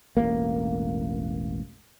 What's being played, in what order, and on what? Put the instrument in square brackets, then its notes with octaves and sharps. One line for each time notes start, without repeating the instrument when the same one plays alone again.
[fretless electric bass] E1 A1 A#3